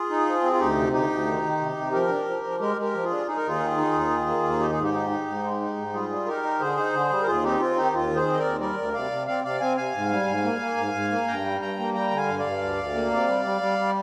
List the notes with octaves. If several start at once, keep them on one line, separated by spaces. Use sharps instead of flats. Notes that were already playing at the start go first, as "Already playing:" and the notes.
Already playing: F4 G#4
D#4
F3
C4
F4
D2 D#4 G4
C3
D2 D#4 G4
D2
D#3
D#3
C3
C3
F3 G4 A#4
D4
F3
F3
G#3 G4 A#4
G#3 G4 A#4
F3
F4 G#4
D4
D#4 G#4
A#4
D#2 F4 G#4
D#3
D#4
D#2
D#3
A#3
D#2
D#4 G4
G#2 G#4
D#4 G4
D#4
D#4
G#2
G#3
D#4
G#2
G3 F4 G#4
G3
D#4 G4 A#4
D#4
D3 G#4 C5
D#4
D3
G3
A#4
D#2 F4 G#4
C4 D#4 G4
C4 F4
D#3 D#4 G4
D#2 F4
D#3
G#4 C5
C4
D#5
A#4 D5
D#2
G3 A#4 D5
D2
C3 D5 F5
C3
C4 D5 F5
C3 D5 F5
C4 F5 G#5
C3 F5 G#5
G#2
G3
G#2
A#3
A#3
G#2
G#2
A#3
G2 G5 A#5
G3
G2 G5 A#5
A#3
G3 G5 A#5
D3
F5 G#5
G2
G2 D5 F5
D2
D2
A#3
C3
G3
G3
G3
G3